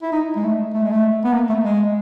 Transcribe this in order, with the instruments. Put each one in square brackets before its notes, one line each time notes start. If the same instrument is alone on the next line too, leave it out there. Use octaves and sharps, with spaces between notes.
[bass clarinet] E4
D#4
G#3
A3
A3
G#3
A3
B3
A#3
A3
G#3